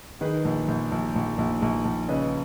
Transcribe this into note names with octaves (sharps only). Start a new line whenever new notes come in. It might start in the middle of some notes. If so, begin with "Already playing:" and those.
D#3 G#4 B4
A#1
A#1
A#1
A#1
A#1
A#1
A#1
C#3 B4 D#5